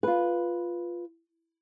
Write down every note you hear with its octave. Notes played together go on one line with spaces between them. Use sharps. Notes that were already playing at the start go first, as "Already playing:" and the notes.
F4 B4